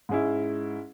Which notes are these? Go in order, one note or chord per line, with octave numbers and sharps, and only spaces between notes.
G#2 G#3 C#4 E4